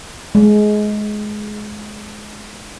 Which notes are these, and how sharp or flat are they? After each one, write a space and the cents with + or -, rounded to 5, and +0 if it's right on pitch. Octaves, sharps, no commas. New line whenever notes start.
G#3 +20